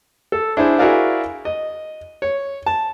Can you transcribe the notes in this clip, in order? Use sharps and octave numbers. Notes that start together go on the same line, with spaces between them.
A4
D4 E4 G#4 C5
E4 F#4 G#4 A#4 D5 F5
D#5
C#5
A5